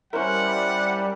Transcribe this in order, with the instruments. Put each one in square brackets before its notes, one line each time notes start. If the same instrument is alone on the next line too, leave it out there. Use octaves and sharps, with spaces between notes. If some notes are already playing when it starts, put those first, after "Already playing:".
[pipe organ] G3 [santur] C#4 A#4 [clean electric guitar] E4 C5 [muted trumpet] F#5